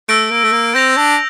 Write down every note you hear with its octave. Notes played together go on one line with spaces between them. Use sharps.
A3 E6 A#6 D7
A#3
A3
A#3
C4 G6 A#6 F7
D4